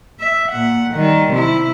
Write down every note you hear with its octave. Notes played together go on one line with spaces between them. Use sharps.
E5
A#2 F#5
D#3 G3
C3 E4